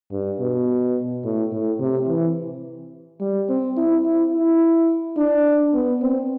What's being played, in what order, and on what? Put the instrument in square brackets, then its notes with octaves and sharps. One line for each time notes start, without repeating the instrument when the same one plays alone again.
[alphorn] G2
B2
A2
A2
C3
E3
G3
C4
E4
E4
E4
D4
B3
C4